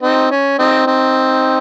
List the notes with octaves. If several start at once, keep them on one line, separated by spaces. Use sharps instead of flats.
C4 D#4
C#4
C4 D#4
C4 D#4